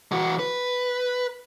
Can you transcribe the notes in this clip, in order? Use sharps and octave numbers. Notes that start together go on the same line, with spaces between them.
E3 F#4
B4